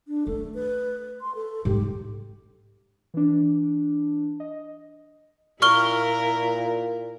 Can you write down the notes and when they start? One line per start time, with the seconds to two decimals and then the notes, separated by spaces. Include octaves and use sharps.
0.08 D4
0.27 A3 A4
0.54 B4
1.21 C6
1.35 A4
1.65 G#2 D#4 G4
3.14 E3 D4
4.40 D#5
5.62 A#2 E4 A#4 C#6 F6 G7